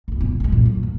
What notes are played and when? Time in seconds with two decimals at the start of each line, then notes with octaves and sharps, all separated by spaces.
0.08 G1 C#2
0.20 F2 B2
0.40 G#3 C#4
0.52 F#2 A#2
0.66 F#3
0.83 D#2